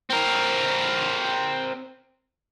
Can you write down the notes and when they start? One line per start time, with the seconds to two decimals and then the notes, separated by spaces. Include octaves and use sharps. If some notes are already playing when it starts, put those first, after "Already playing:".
0.10 C4 A#4